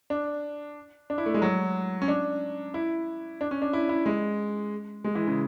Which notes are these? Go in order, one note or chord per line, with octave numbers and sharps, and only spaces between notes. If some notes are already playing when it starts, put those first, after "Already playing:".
D4
D4
E4
A3
G#3
F#3
C#4
D4
E4
D4
C#4
D4
E4
E4
G#3
G#3
E3
C#3